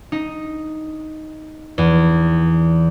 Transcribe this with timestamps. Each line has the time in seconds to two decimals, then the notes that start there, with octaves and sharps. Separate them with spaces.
0.12 D#4
1.78 E2